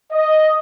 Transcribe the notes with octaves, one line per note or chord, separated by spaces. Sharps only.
D#5